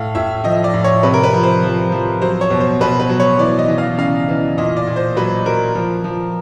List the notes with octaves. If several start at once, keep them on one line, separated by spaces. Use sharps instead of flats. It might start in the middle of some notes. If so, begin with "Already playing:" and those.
Already playing: A2 F5
A2 E5
F3 D#5
D5
A2
C#5
C3 B4
A#4
B4
F3
C5
F3
F3
F#3 C5
C#5
B2
C5
B2 B4
B4
F#3
C#5
E3 D5
D#5
E3
F5
C#3 F5
E3
A#2 D#5
D5
A#2
C5
F#3 B4
F#3 A#4
F3
F3